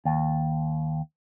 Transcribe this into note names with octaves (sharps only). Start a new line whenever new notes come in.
D#2